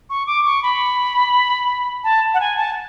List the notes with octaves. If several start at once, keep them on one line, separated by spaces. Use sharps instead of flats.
C#6
D6
C#6
B5
A5
F#5
G#5
A5